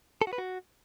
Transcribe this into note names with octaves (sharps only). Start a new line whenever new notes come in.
A4
F#4
B4
F#4